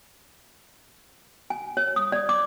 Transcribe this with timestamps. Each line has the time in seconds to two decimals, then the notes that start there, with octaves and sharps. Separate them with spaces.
1.50 G#5
1.77 C#5
1.96 D#6
2.12 D5
2.29 D6